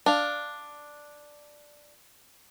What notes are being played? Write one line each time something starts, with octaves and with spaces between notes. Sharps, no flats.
D4 F5